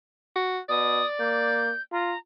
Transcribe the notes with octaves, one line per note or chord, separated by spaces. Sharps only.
F#4
B2 D5 D#6
A#3 G6
F4 A#5